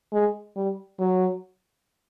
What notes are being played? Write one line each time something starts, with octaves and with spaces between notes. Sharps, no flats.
G#3
G3
F#3